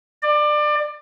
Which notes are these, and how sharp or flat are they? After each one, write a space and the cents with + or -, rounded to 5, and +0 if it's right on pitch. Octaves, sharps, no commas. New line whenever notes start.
D5 +25